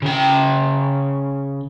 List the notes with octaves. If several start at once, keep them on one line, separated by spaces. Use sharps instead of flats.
C#3 G5